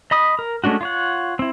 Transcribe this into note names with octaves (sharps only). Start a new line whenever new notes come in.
D#5 B5 D#6
A#4
G#3 A3 C#4 D4 F#4
F4 C#5 F#5
C4 E4